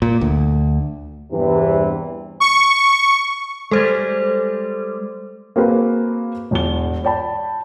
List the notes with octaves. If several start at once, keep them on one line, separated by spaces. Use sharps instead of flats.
A#2
D2
E2 G2 C3 E3
C#6
G3 G#3 A4 C5
A#3 C4 F#4 G#4 B4
E1 E2 G7
C#5 D5 G5 A5 B5